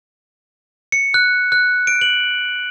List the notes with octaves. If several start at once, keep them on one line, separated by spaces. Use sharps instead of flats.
C#7
F#6
F#6
D7
F#7